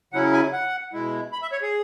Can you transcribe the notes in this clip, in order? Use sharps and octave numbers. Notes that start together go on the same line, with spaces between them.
C#3 F#3 C#4 E4 F#5
G#5
F#5
B2 G#3 E4
B5
E5
C#5
G#4